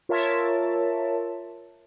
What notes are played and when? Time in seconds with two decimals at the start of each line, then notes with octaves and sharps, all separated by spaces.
0.09 F4 A#4 C#5 E5 A5